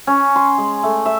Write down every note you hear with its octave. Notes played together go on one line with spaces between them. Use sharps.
C#4
C6
G#3
A3
E5